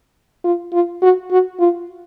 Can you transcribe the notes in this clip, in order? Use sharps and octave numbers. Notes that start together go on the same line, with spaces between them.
F4
F4
F#4
F#4
F4